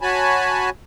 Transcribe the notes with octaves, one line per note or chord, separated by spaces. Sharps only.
F#4 C#5 G#5 A5 B5